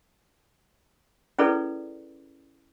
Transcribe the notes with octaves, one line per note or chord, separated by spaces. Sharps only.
C#4 E4 G#4 A4 B4 D5